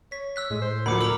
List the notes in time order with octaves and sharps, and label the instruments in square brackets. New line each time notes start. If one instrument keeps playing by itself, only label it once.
[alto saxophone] C#5 [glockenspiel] B6
[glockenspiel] E6 F#6 B6
[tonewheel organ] A2 [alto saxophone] G#3
[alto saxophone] C5
[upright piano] D2 F3 [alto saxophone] A#4 [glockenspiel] B5 D6 C#7
[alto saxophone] A#4 [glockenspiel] A#5 D6 E6 [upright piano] F#7